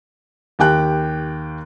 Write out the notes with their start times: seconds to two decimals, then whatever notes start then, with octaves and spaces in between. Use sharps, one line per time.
0.59 D#2 G4 G5 F#6